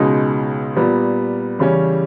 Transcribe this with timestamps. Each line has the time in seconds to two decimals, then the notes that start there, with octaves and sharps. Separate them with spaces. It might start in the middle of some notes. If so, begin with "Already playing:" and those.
Already playing: C#2 B2 G#3 D#4
0.76 A#2 G3 B3
1.59 E2 C#3 G3 C#4